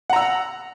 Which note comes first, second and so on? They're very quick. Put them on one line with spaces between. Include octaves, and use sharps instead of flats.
F#5 A#5 E6